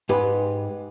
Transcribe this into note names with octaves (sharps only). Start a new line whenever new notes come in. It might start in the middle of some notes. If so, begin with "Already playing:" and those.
G#2 G4 B4